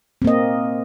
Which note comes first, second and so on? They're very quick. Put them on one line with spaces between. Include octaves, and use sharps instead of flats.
C4 A#3 D#5